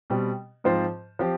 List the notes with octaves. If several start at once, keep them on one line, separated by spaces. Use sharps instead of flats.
B2 G3 C4
G#2 F3 C4 F4 C5
F3 C4 G4